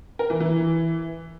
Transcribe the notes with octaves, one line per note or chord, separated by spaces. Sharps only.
A#4
E3
E3